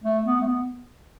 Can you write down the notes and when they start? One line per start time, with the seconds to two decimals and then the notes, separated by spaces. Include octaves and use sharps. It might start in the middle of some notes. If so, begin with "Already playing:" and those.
0.04 A3
0.25 B3
0.41 A3
0.46 B3